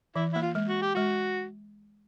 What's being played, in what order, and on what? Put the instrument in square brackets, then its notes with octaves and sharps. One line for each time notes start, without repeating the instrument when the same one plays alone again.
[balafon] E3 [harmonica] E4
[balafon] A#3 [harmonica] E4
[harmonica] F4
[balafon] G#3
[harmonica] F#4
G4
[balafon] G#3 [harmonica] F#4